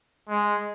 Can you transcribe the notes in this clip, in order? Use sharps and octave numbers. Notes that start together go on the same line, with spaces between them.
G#3